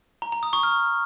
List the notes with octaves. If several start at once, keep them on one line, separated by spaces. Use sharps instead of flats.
A#5
A#5
D#6
C#6
F6